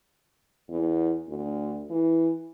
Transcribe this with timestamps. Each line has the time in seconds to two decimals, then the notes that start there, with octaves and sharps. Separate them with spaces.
0.69 E2
1.28 D2
1.90 E3